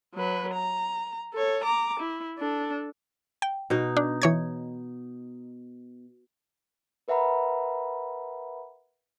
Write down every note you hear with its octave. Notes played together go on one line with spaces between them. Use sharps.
F#3 B4
A#5
A4 C#5
A#5 D6
E4
D4 A4
G5
B2 D#4
D4
E3 C#5 G#6
A#4 B4 E5 F#5 A#5 B5